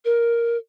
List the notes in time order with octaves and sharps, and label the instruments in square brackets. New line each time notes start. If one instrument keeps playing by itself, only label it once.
[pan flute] A#4